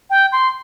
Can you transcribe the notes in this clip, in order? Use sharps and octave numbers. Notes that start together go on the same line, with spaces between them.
G5
C6